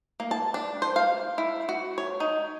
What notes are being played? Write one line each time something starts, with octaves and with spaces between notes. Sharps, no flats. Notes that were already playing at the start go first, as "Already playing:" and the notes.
A#3
A5
D4
C5
F5
E4
F#4
C#5
D#4